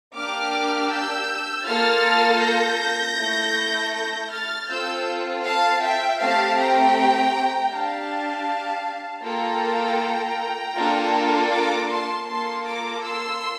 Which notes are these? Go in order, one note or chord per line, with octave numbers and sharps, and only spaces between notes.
A#3 D4 G4 D6 F6
E6 G6
A#3 F4 A4 F6 A6
G6 A#6
A3 E4 A4
G6 A#6
F6 A6
C4 F4 A4 E6 G6
F5 A5
E5 G5
A3 C4 G4 F5 A5
G5 A#5
D4 G4 F5 A5
A#3 F4 A4 G5 A#5
A#3 D4 F4 A4
A#5 D6
A5 C6
A#3 F4 A4 A5 C6
A#5 D6
C6 E6